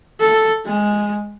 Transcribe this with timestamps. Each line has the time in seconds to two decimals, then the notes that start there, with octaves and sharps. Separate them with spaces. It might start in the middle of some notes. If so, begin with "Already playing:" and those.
0.20 A4
0.65 G#3